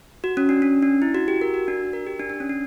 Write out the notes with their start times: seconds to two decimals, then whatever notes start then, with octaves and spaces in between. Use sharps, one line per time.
0.24 F#4
0.37 C#4
0.49 D4
0.62 C#4
0.82 D4
1.02 E4
1.15 F#4
1.28 G4
1.41 A#4
1.54 F#4
1.68 D4
1.93 A#4
2.07 G4
2.19 D4
2.30 D4
2.40 C#4
2.49 D4